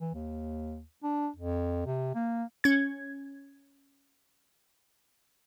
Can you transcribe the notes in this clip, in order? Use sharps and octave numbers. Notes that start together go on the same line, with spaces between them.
E3
D#2
D4
F2
C3
A#3
C#4 G#6